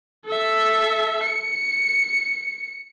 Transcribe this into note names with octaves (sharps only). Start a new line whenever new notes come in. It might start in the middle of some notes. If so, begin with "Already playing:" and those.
A4 E5
C#7